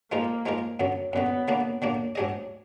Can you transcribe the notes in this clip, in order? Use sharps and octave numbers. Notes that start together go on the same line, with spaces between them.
F3 G#3 A#3 D#4 A#4
F3 G#3 D#4 A#4
F#2 D3 F#3
F#2 D3 F#3 B3
D3 F#3 A#3 D4
D3 F#3 A#3 D4
G#2 F#3 D4 G#4 D#5